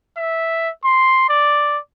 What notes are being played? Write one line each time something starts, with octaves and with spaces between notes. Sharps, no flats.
E5
C6
D5